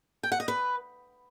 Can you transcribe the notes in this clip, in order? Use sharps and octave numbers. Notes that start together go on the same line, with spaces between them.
G5
F#5
D#5
B4